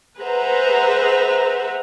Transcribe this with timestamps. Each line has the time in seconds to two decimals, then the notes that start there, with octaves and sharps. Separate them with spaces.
0.18 G#4 B4 C5 E5 F#5 A#5